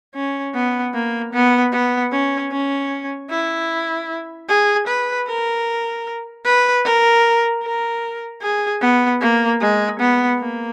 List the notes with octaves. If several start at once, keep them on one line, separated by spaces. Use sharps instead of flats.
C#4
B3
A#3
B3
B3
C#4
C#4
E4
G#4
B4
A#4
B4
A#4
A#4
G#4
B3
A#3
G#3
B3
A#3